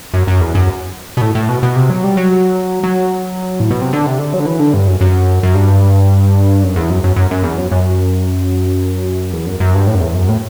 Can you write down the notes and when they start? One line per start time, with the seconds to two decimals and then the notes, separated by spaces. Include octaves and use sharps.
0.14 F#2
0.27 F#2
0.41 E2
0.55 F#2
1.17 B2
1.21 A2
1.35 A2
1.49 B2
1.63 B2
1.76 C3
1.90 F#3
2.04 G3
2.17 F#3
2.84 F#3
3.60 A2
3.70 B2
3.81 C3
3.93 D3
4.06 C3
4.19 D3
4.33 F#3
4.40 D3
4.46 E3
4.59 D3
4.74 G2
4.88 F#2
5.01 F#2
5.43 F#2
5.55 G2
6.63 F#2
6.76 E2
6.90 F#2
7.04 F#2
7.16 F#2
7.31 F#2
7.43 E2
7.58 F#2
7.72 F#2
9.33 E2
9.46 F#2
9.60 F#2
9.75 G2
9.87 A2
9.95 F#2
10.01 E2
10.15 F#2
10.29 A2